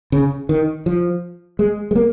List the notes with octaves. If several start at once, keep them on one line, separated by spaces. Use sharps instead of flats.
C#3
D#3
F3
G#3
G#3
A#3